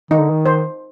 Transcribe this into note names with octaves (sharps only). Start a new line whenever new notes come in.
D#3 D#4
D3
D#3
C5